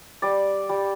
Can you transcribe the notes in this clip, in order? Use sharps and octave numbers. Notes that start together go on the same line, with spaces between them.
G3 D5
G3